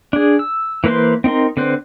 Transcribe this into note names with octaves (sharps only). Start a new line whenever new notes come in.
D4 G#4
E6
E3 A#3 B4 C5 C6
C4 D#4 A#4 C6
D3 C4 B4 C5